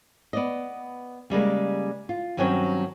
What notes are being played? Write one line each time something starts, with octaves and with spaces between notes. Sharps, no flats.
B3 D5 D#5
C#3 G3 G#3 A#3
F4
G2 D#3 F#3 C4 C#4 C#5